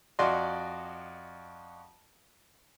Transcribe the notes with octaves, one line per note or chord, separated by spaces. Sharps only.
F2 F#4 D5 D#5 C6